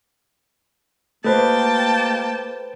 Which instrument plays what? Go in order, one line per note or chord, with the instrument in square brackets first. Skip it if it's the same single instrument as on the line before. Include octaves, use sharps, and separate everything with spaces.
[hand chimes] A3 F#4 [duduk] A#3 [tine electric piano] A4 B4 C5 [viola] G5 A5